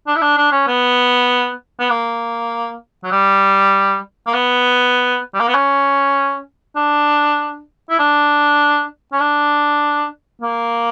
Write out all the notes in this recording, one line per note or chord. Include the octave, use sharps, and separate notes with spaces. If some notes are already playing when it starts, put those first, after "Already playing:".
D4
E4
D4
D4
C#4
B3
B3
A#3
F#3
G3
A#3
B3
G3
A#3
B3
C#4
D4
E4
D4
C#4
D4
A#3